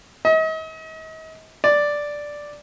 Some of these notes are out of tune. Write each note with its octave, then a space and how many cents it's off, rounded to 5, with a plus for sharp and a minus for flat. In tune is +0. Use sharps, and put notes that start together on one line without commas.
D#5 +40
D5 +0